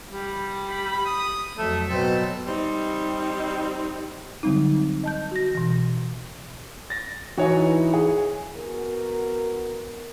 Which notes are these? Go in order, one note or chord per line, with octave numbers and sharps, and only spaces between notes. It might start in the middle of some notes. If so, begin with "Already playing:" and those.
G3
B5
D#6
F2 F#3 A3 E5
B2 F#3 C4 A4
G3 C4 D#4
D3 F#3 G3 C4 D#4
D#5 A5 G6
F#4 A#6
B2 E3
A6 A#6
E3 D#4 F#4 C#5 G#5
G#4
B3 F#4 A#4